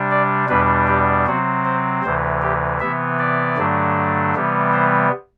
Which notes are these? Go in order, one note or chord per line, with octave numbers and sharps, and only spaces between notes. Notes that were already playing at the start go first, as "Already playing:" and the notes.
Already playing: C3 G3 D4
D5
E2 B2 G3 D4 B4
G4
C3 F#3 C4 F#4
C5
D2 C3 E3 C5
G4
C3 E3 B3 E5
D5
G2 D3 F#3 A3 D4
C3 E3 G3 B3
C5